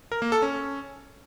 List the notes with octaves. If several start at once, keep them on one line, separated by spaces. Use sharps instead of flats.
A#4
A#3
A4
C#4